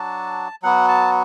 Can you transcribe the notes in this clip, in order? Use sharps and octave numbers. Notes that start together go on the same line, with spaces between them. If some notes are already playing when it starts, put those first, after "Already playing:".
Already playing: F#3 D4 F#4 A5
F#3 B3 F#4 F#5
A5